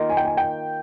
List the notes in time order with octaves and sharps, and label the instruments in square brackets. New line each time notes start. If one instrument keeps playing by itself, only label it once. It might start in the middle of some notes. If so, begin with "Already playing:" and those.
Already playing: [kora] D#3 A#3 F4
[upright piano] G#5
G5
G#5
G5